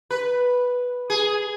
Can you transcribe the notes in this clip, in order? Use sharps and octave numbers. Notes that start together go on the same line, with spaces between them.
B4
G#4